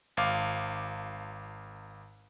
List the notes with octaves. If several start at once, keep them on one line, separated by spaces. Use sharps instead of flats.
G#1 F5 D6